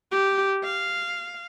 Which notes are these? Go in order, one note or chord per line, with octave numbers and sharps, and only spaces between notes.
G4
F5